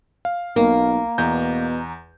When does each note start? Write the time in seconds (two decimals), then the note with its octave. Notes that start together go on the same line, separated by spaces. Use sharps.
0.25 F5
0.56 B1 A#3
1.18 E2 B2 A#5 G6